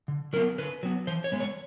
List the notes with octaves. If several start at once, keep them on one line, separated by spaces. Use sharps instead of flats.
D3
F#3 B3 A#4
D3 B4
F#3 B3
E3 C5
C#5
G#3 B3
C#5